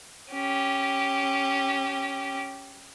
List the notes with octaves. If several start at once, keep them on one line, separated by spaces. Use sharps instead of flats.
C#4 G4